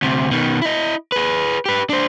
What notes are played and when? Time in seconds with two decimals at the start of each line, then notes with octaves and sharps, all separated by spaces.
0.02 D2 C3
0.31 B2 D#3
0.62 E4 D#5
1.12 G#4 B4
1.66 G4 B4
1.89 D4 C5